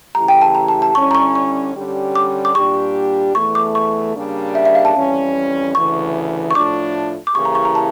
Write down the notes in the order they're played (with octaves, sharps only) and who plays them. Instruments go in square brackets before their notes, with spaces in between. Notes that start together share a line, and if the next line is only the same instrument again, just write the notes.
[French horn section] C#3 E3 A3 E4 G4 [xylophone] A#5
[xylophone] G5
A5
A#5
A5
A5
[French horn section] D3 G3 C#4 E4 [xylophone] C#6
[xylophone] A#5
C#6
C#6
[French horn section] D3 G3 C#4 G4
[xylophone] D6
D6
[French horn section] A#2 G3 D4 G4 [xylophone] C#6
[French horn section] E2 E3 A3 [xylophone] C#6
[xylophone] D6
C#6
[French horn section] C#3 G3 A#3 D4 G4
[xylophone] E5
E5
F5
A5
[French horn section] F2 E3 G3 C#4
[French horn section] D2 C#3 E3 [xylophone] C#6
[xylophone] C#6
[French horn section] A2 F3 A3 D4 F4 [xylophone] D6
[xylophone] D6
[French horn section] C#3 E3 A#3 E4 G4 [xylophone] C#6
[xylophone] A#5
C#6
A#5
A5